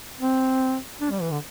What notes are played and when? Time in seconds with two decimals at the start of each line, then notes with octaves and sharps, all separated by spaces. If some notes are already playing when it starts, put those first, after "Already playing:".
0.19 C4
1.01 D4
1.11 G3
1.21 E3
1.31 D3